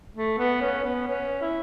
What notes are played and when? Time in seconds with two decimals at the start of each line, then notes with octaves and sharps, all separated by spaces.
0.15 A3
0.38 B3
0.61 C#4
0.84 B3
1.08 C#4
1.42 E4